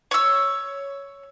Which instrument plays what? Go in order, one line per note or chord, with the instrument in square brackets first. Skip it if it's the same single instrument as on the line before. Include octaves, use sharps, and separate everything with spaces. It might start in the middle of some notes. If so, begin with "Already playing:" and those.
[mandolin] C#5 E6